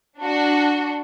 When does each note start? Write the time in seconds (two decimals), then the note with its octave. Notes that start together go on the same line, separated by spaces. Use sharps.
0.20 D4 F#4